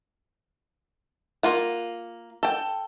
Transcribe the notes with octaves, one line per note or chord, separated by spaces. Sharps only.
A#3 F4 F#5
A4 G5